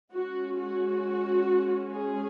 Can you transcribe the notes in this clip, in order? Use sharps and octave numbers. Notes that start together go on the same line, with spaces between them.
G#3 C#4 F#4
F#4
G#4